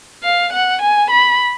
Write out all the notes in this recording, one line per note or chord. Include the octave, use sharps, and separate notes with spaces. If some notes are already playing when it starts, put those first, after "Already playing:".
F5
F#5
G#5
B5